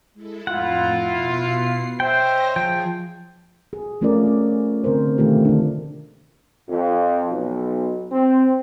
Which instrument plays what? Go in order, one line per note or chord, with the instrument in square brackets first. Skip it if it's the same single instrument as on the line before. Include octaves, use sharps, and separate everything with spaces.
[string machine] G#3 E4 A4
[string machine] F2 A2 A#5 [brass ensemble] E4 F4 [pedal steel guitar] F#5
[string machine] B2 C7
[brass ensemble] C5 E5 [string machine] C#5 D#5 A#6 [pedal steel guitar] G5
[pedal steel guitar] F3 G5 [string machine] G#4
[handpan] G#4
F3 A3 C#4 F4 A#4 D5
C#4
D3 C4 A#4 C5
B2 D#3 A3 F4 G4
D3 D4
[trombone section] F2
B1
C4